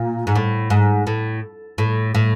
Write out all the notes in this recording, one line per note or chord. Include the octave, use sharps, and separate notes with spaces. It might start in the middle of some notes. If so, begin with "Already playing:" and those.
Already playing: A#2
G#2
A2
G#2
A2
A2
A2